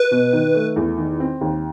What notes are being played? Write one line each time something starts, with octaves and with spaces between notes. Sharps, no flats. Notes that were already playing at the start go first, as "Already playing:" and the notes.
Already playing: B4
B2
D#3
A3
E2
D#3
C4
D#2